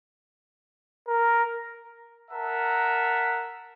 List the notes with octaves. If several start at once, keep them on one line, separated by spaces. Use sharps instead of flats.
A#4
A#4 E5 F#5 A5 A#5